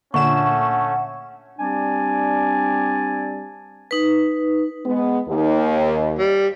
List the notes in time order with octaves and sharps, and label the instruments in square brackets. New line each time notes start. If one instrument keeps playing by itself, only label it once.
[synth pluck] A#2 D3 E7 [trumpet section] A3 C#4 [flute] F#5 [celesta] C#6
[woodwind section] G3 C4 D4 G4 D5 G#5
[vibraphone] D#4 B4
[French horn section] G#3 B3
D#2
[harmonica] G3